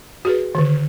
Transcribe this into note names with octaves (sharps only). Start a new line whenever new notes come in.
F#4 G#4 B4
D3 D#3